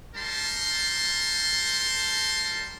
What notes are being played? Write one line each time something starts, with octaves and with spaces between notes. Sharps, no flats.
G3 D#4 A#4 A5 C6